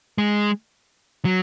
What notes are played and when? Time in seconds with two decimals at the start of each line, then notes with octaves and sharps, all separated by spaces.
0.18 G#3
1.25 F#3